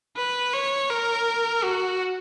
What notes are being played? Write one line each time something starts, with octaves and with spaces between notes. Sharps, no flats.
B4
C#5
A#4
F#4